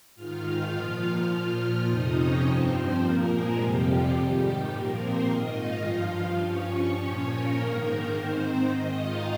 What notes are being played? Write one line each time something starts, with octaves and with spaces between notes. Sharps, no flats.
G#2 D#3 F4 F5
F4 F5
A#2 F3 F4 F5
F4 F5
A#2 F3
F2 C3 F3 D#4 D#5
C#4 C#5
G2 F3 C4 C5
A#2 F3 A#3 A#4
G#3 G#4
F2 C3 F3 G3 G4
F3 F4
G#2 D#3 G3 G4
A#2 F3 A#3 A#4
C4 C5
G#2 D#3 D#4 D#5
F4 F5
G2 F3
G2 F3 C#4 C#5
A#2 F3
A#3 A#4
G#2 D#3
A#3 A#4
G#2 D#3 C4 C5
G#2 D#3 D#4 D#5
F4 F5